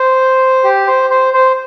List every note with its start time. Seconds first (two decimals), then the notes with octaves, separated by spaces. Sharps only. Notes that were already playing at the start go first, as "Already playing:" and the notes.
Already playing: C5
0.64 G4
0.87 C5
1.10 C5
1.34 C5